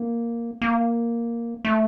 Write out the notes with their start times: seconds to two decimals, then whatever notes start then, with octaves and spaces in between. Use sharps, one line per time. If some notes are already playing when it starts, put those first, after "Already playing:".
Already playing: A#3
0.62 A#3
1.65 A3